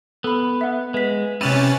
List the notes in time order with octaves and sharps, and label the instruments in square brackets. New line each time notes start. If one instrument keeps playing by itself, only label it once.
[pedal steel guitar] B3 [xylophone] A4 B5
[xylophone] E5 F#5
[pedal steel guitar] G#3 [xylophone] B4 B6
[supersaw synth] C3 C#4 A6 [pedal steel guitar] E4 G4 B4 [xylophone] D#7 F7